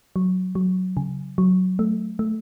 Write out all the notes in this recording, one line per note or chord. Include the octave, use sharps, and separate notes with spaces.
F#3
F#3
C#3
F#3
A3
A3